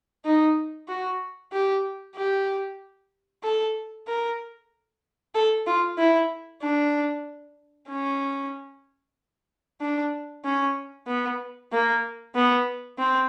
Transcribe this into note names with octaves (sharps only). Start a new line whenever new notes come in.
D#4
F#4
G4
G4
A4
A#4
A4
F4
E4
D4
C#4
D4
C#4
B3
A#3
B3
C4